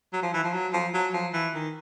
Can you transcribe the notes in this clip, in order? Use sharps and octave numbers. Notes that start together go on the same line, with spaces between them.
F#3
F3
E3
F3
F#3
F3
F#3
F3
E3
D#3